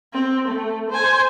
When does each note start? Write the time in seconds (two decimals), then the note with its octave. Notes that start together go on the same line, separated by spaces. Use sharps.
0.14 C4
0.48 A3
0.90 C5 G#5